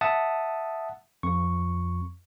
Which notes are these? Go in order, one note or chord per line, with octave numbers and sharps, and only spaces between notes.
E5 F#5 A5 D#6
F2 C#6